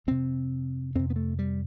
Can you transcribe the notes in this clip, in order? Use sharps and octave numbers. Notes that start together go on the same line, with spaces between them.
F2 C3 C4
F2 C3 C4
B3
A3
G3